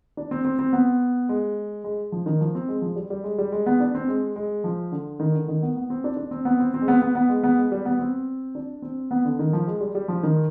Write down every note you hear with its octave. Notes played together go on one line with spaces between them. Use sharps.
D4
C4
C4
C4
B3
G#3
G#3
F3
D#3
F3
C4
G#3
F3
G3
G3
G#3
G3
G#3
B3
D4
C4
G#3
G#3
F3
D3
D#3
D3
D#3
B3
B3
C4
D4
D4
C4
B3
C4
C4
G#3
B3
B3
B3
G#3
B3
G#3
G3
B3
C4
D4
C4
B3
D3
D#3
F3
G#3
G3
G3
F3
D#3